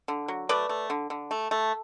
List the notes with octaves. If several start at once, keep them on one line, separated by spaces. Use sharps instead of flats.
D3
F#3
A3 B4 D5
A3
D3
D3
A3
A3